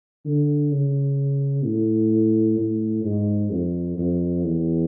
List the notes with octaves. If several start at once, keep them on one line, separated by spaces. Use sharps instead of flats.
D3
C#3
A2
A2
G#2
F2
F2
E2